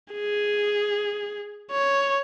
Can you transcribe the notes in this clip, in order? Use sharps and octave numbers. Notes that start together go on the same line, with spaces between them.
G#4
C#5